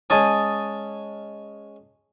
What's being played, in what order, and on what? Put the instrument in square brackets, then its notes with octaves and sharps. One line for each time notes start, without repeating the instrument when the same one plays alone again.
[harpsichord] G#3 C#4 [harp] G#5 A5 D#6